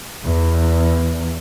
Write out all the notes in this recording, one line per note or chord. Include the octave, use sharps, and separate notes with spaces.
E2